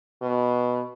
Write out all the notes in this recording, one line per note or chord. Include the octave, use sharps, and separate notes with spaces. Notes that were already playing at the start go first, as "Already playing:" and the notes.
B2